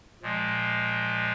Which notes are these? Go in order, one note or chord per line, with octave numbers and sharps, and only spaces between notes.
A#2 F3 G#3